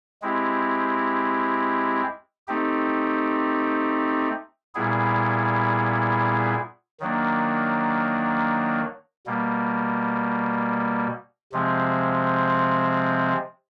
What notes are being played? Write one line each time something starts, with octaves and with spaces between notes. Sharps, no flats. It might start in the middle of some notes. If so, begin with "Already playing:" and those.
G#3 C4 E4 G4
A3 C4 D#4 G4
A#2 G3 B3 E4 G#4
D#3 F#3 A#3 D4
B2 G3 A#3
C3 F3 G#3 C4